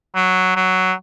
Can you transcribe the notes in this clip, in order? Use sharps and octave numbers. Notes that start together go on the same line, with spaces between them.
F#3
F#3